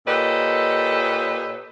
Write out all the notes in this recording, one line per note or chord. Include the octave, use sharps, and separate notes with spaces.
A#2 G4 A4 B4 C#5 D#5